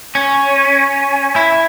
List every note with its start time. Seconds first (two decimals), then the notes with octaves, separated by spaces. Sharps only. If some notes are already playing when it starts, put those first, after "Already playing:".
0.15 C#4
1.36 E4